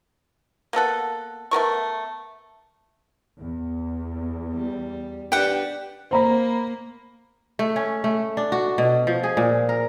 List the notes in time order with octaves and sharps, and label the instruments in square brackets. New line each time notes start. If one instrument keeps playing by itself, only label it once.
[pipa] A#3 B3 A4 F#5
A3 B3 A#4 C#6
[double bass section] E2
[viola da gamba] G3
[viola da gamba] D4 G4 B4 [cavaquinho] F#5 G5
[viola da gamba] A#3 [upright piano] C5 A#5 B5
[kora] A3
C#4
A3
D4
F#4
B2
F3
G#4
A#2
A#4